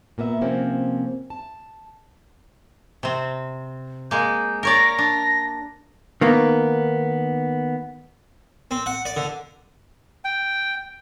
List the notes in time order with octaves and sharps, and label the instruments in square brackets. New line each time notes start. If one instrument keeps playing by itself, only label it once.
[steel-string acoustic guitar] A#2 A#3 B3 E5
C3 F3 A#3 C4 C#4
A5
[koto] C3 C4
[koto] G#3 A#3 [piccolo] G6
[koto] A#4 C#5 D5 [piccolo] A#6
[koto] D4
[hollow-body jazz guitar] D#3 A#3 B3
[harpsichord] C4
F#5
D5
D3
[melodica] G5